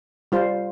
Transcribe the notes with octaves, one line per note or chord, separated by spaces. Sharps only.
G3 F4 C5